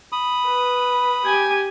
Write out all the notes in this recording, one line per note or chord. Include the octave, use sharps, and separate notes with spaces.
B5 D#6
B4
G4 G#5